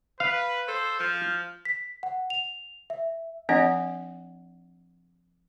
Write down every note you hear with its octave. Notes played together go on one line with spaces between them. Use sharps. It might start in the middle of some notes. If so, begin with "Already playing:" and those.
B4 F5
A4 C5
F3 F6
B6
F#5
F7
E5
F3 C4 D4 D#5 F#5